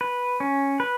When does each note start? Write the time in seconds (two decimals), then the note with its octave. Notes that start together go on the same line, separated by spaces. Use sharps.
0.01 B4
0.40 C#4
0.80 B4